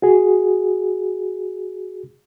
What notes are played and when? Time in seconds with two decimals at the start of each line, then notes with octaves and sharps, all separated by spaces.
0.02 F#4 G#4